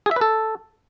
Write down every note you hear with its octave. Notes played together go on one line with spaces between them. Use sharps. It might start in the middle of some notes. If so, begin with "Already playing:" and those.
G#4
E5
B4
A4